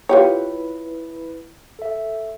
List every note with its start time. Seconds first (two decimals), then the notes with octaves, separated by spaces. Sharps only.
0.09 E4 F4 G4 B4 C#5
1.79 A4 E5